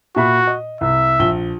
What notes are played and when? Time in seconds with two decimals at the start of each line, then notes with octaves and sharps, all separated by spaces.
0.16 A#2 F#4 E5 B5
0.47 D#5
0.81 C2 E5
1.19 A#1 G7